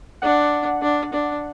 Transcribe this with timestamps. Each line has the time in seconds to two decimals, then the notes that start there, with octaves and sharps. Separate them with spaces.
0.22 D4 F#5
0.82 D4
1.13 D4